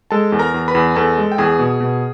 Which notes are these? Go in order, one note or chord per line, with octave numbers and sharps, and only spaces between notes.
G#3 A4 A5
E2
A#4 A#5
E2
B4 B5
E2
E2 A4 A5
G#3
G5
E2 G#4 G#5
B2
B2